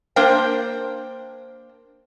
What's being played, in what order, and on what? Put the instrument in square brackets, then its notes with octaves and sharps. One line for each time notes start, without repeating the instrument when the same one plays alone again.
[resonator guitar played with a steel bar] A#3 D4 A#4 C5 G5